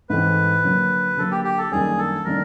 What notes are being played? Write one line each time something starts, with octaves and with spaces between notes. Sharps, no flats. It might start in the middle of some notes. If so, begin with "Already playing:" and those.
G#2 E3 A3 C4 B4
D3 F#3 A#3
D3 F#3 A#3 A4
G4
G4
A4
F#2 D#3 G3 A#3 D4 G#4
A4
D#3 G3 A#3 D4 A#4